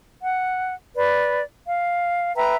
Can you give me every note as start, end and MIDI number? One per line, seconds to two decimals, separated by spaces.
0.22 0.74 78
0.95 1.41 71
0.95 1.41 74
1.66 2.34 77
2.36 2.56 71
2.36 2.56 76
2.36 2.56 79
2.36 2.56 82